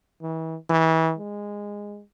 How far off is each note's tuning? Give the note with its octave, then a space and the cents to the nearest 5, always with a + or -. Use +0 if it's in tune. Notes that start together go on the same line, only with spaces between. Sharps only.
E3 -35
E3 -30
G#3 -15